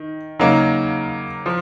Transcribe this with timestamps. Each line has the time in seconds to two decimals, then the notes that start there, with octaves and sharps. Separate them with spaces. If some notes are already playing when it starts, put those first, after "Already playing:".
Already playing: D#3
0.39 C#3 F#3 A#3 D#4
1.46 F3